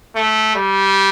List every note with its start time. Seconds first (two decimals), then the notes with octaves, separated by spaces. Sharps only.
0.15 A3
0.56 G3